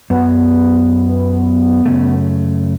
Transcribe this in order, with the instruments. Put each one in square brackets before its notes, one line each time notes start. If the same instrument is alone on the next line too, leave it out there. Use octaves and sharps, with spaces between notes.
[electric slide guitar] F#2 F#3 [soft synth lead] B3
[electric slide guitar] F#2 C#3 A3